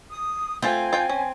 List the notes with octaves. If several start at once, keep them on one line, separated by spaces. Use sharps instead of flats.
D#6
A3 C4 F4 G5 G#5
F4 G5
C#4